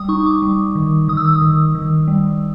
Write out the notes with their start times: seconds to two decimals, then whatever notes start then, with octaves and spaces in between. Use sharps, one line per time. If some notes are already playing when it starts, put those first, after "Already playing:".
Already playing: G3 D#6
0.09 D#4 C#6
0.26 D6
0.42 G3
0.75 D#3
1.08 D#3 D#6
1.17 E6
1.26 D#6
1.42 D#3
1.75 D#3
2.07 G3